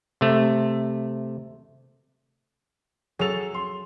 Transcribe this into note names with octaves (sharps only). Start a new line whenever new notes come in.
C3 A3
F#3 G#4 A4 F7
C6